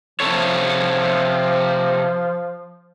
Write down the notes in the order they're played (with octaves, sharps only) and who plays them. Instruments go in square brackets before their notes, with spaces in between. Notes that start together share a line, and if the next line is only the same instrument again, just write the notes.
[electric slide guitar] C3 A4 C#5 [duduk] F3